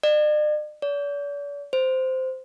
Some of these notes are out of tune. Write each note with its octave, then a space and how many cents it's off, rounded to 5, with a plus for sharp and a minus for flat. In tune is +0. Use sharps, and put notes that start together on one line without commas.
D5 +45
D5 -45
C5 -10